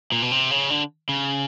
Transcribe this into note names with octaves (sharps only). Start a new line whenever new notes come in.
A#2
B2
C3
C#3
D3
C#3